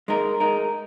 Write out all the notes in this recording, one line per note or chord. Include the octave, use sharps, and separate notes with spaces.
G#3 D#4 A#4
G#3 D#4 A#4